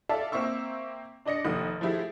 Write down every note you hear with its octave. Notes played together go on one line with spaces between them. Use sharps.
A4 D5 E5 F5 A5
A#3 C4 E5 C#6 E6
D4 D5 D#5 A#6 C#7
F1 D#2 D#6
F3 A3 E4 G4 G#4